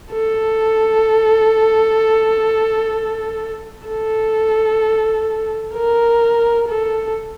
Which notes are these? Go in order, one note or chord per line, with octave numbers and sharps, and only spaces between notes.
A4
A4
A#4
A4